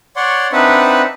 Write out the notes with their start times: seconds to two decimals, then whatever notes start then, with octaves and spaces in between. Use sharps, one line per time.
0.16 C#5 D5 F#5 C6
0.52 C4 D4 D#4 B4 E5 F#5